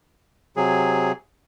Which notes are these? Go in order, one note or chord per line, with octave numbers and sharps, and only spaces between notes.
C3 F#3 G#4